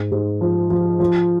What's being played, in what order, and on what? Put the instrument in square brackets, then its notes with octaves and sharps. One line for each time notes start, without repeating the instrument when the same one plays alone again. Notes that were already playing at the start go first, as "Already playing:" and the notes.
Already playing: [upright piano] G#2
G#2
F3
F3
F3